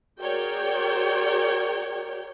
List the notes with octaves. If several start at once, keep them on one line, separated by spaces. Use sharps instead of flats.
F#4 G#4 A#4 C#5 D5 G5